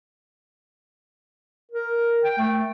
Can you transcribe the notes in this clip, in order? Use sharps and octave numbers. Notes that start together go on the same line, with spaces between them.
A#4
G5
A3